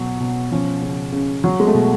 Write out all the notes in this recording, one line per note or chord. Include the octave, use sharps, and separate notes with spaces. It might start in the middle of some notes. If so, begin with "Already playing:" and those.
Already playing: B2 F#3
B2
F3 C#4
C#3
C#3
F#3
G#3
A3
B2